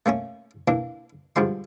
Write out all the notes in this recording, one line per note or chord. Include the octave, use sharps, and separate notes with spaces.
A3 A#3 C#4 C#5
E3 A#3 D4
G2 D3 F3 G#3 C6